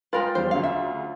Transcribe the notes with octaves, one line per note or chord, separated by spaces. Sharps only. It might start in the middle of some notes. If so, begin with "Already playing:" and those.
G#3 F4 A#4 B4 G5 A6
E2 G3 C5
D2 C#3 F#3 F5
E5